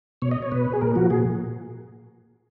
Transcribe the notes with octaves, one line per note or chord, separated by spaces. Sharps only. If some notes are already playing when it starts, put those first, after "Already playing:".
B2 C#5
D#5
C#5
B2 B4
G#4
A#2 A#4
F3 F#4
A#2 G#4